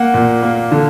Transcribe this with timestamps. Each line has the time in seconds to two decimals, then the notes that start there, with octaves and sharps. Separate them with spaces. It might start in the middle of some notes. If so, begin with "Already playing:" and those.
Already playing: A#3 F#5
0.14 A#2
0.43 A#3
0.71 D3